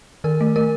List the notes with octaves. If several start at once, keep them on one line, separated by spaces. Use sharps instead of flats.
D#3 A#4
A3
A3 A#4